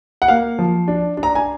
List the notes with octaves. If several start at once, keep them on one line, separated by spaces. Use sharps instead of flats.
F#5
A#3 F5
F3
D4
D4
A#5
G#5